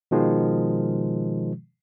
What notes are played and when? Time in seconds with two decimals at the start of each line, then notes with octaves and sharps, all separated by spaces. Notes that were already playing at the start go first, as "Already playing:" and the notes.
0.11 B2 D#3 F3 G#3